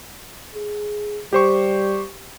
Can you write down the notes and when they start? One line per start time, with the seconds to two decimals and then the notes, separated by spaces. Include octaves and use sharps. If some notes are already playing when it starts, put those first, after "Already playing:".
0.55 G#4
1.33 G3 G4 C5 C#6